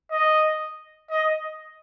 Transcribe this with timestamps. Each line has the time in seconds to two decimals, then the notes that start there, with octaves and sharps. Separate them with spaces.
0.11 D#5
1.11 D#5